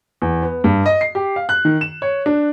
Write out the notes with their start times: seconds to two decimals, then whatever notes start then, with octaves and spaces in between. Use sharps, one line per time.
0.22 E2
0.43 B3
0.64 G2
0.86 D#5
1.01 C7
1.15 G4
1.36 F5
1.49 F#6
1.65 D#3
1.81 E7
2.02 C#5
2.26 D4